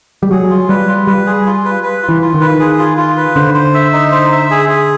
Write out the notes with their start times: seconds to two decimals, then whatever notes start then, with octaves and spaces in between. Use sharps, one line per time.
0.23 G3
0.31 F#3 G#4
0.50 F4
0.69 G3 B4
0.88 F4
1.07 G3 B4
1.26 G#4
1.46 F4
1.65 B4
1.83 B4
2.03 F4
2.09 E3
2.22 F4
2.34 D#3
2.41 B4
2.60 G#4
2.78 F4
2.97 F4
3.17 B4
3.35 D3 C5
3.54 C5
3.74 E5
3.93 D#4
4.12 C5
4.32 E5
4.51 G#4
4.69 G#4